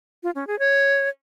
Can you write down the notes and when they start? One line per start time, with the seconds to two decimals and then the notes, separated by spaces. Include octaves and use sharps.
0.23 F4
0.35 C#4
0.47 G#4
0.59 C#5